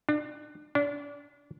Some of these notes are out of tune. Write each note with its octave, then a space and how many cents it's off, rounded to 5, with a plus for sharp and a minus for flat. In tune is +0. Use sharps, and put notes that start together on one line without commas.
D4 +30
D4 -30